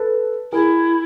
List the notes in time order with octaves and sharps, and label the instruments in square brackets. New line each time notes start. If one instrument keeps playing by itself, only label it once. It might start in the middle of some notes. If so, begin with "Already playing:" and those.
Already playing: [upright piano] A4 B4
[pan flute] E4 [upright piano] G#4 A#4